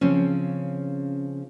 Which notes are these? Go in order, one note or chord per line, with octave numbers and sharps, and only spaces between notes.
C#3 F3 C4 C#4